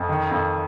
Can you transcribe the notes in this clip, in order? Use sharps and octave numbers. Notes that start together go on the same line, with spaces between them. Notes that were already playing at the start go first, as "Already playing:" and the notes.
Already playing: F2
D#3
F2